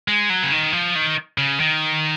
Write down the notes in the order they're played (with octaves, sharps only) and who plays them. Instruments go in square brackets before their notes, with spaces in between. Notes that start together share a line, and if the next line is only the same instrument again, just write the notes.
[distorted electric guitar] G#3
F#3
C#3
D#3
F3
D#3
C#3
D#3